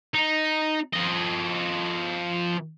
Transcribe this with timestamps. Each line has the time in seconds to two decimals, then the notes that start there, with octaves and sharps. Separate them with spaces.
0.14 D#4
0.93 F3 D#5